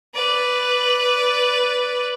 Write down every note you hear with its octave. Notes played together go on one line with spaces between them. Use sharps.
B4 D5